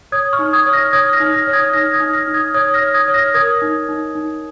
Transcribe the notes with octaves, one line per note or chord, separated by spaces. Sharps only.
C#5 D#6 G#6
C#6 F6
D#4
D#6 G#6
C#5
F6 A#6
C#5 D#6 G#6
F6 A#6
D#4
F6 A#6
C#5
D#6 G#6
D#4 F6 A#6
D#6 G#6
D#4
F6 A#6
D#4
D#6 G#6
C#5 D#6 G#6
F6 A#6
C#5
D#6 G#6
C#5
F6 A#6
A#4 D#6 G#6
D#4
D#4
D#4